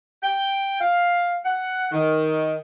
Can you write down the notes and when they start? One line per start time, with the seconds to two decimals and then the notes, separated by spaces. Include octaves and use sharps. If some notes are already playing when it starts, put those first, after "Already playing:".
0.23 G5
0.80 F5
1.45 F#5
1.91 D#3